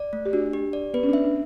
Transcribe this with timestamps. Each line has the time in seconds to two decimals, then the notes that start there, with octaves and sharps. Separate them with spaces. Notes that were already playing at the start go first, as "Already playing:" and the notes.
Already playing: D5
0.13 A3
0.26 G4
0.33 D4 F#4
0.53 G4
0.73 D5
0.94 B3 B4
1.03 C#4
1.09 D4 E5
1.24 D4